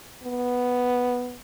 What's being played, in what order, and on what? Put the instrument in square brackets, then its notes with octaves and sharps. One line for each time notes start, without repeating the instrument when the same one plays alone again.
[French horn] B3